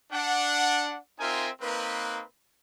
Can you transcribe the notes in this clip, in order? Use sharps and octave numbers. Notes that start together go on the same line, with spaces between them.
D4 F#5
C4 D#4 F4 A#4 E5 G#5
A#3 C4 D#4 B4